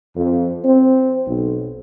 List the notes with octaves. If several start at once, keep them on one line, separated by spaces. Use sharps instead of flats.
F2
C4
B1